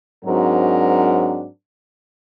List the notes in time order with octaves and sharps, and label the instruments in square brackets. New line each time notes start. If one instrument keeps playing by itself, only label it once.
[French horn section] G#2 F#3 C4 D4 F#4 A#4